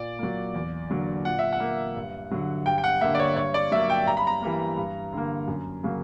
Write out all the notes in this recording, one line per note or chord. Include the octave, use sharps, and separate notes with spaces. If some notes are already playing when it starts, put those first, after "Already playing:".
Already playing: A#2 D5
F#3 A#3
E2
D3 F#3 A#3
A#2 F#5
E5
F#5
A#3
G2
D3 F#3
G2 G5
G5
F#5
D3 A#3 E5
D5
C#5
G2 C#5
D5
F#3 A#3 E5
G5
G2 A#5
B5
A#5
E3 G3 A#3
G2
D3 G3 A#3
F#2
C#3 F#3 A#3